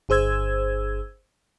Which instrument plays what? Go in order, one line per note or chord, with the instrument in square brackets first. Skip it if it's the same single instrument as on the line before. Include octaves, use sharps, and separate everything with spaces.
[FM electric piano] G1 G#4 C5 E6 G#6